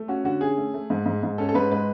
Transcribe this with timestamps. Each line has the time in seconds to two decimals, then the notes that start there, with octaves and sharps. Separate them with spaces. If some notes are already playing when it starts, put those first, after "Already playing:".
Already playing: A3
0.08 C#4 F#4
0.24 D3 F#4
0.41 C#4 G#4
0.57 A3
0.74 A3
0.90 G#2
1.06 G#2
1.23 G#2
1.38 C#4 A4
1.49 A4
1.55 G#2 B4
1.71 G#3 B4